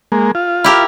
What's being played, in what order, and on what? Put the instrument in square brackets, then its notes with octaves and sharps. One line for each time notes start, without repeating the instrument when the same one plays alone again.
[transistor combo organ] G#3 A#3
F4
[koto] E4 G4 A#4